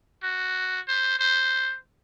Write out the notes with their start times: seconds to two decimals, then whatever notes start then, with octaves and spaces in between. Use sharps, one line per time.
0.23 F#4
0.88 C5
1.19 C5